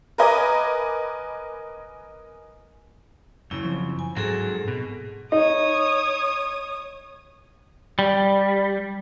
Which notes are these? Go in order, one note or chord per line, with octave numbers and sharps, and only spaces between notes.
A#4 B4 D#5 G#5 D6
F#2 C#3 E4
F3 C4
G#5
G#2 F#3 C4 G#4 A4
B2
D#4 C#5 D#6
G3